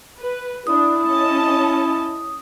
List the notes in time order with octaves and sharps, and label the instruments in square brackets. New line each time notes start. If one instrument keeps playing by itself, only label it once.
[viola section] B4
[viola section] D4 [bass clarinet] E4 [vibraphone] D#6
[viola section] C#4 D#5 A5